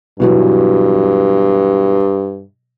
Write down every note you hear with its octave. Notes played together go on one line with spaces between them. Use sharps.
G2 B2 E3 F#3